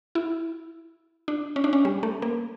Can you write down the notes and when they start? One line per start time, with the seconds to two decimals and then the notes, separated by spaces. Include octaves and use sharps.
0.15 E4
1.28 D4
1.56 C#4
1.64 D4
1.73 C#4
1.85 G3
2.03 A3
2.22 A#3